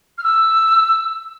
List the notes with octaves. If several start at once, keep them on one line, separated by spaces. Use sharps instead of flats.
F6
E6